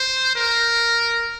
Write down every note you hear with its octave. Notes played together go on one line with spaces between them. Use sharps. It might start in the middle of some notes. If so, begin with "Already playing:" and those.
Already playing: C5
A#4